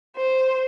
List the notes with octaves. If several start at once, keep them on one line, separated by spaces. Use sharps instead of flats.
C5